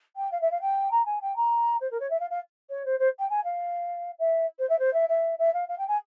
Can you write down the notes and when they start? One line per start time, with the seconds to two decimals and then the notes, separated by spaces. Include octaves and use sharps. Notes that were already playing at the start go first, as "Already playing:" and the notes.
0.16 G5
0.31 F5
0.41 E5
0.51 F5
0.61 G5
0.91 A#5
1.05 G#5
1.21 G5
1.36 A#5
1.80 C5
1.91 A#4
2.00 C#5
2.10 E5
2.20 F5
2.30 F5
2.69 C#5
2.85 C5
2.99 C5
3.19 G5
3.30 G#5
3.44 F5
4.19 E5
4.59 C5
4.69 E5
4.79 C5
4.93 E5
5.09 E5
5.38 E5
5.54 F5
5.68 F5
5.78 G5
5.88 G#5